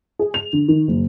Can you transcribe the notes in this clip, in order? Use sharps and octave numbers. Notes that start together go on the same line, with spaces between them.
G#4
F7
D3
D#3
F#1